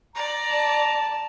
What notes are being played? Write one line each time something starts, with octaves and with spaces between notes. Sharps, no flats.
D5 A#5
A5